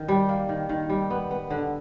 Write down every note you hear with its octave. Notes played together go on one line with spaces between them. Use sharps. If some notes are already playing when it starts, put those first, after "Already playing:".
Already playing: D#3
G3
A#3
D#3
D#3
G3
B3
B3
D3